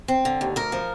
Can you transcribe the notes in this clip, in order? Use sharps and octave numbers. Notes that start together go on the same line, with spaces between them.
C4
D3
D#2
D2 A#4
F3